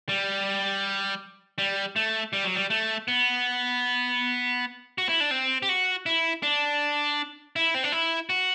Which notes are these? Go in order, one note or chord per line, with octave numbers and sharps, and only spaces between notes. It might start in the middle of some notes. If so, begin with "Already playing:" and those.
G3
G3
A3
G3
F#3
G3
A3
B3
F#4
E4
D4
C4
G4
F#4
E4
D4
E4
C4
D4
E4
F#4